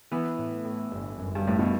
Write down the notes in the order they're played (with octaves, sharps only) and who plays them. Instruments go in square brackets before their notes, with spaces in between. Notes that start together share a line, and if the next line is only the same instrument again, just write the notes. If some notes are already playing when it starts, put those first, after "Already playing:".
[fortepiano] E3 [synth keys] B3
[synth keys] A2
A2
G1
F#2
[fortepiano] G2
[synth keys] G1 [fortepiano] A2
[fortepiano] B2